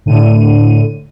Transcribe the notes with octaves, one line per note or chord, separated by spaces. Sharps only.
A2 D3 D#7